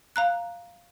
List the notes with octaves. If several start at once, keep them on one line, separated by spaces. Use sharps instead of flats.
F5 A#5 F#6